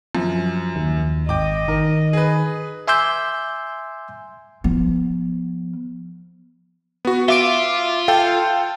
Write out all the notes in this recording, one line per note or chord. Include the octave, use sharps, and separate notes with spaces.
F#2 F3
D#2
G#1 D#5 G5 D6
D#3 A#4
G#4 B4
E5 G#5 C6 D6 E6 G6
F3 B3
B3 F#4
F4 E5 D6 D7
A4 F5 G5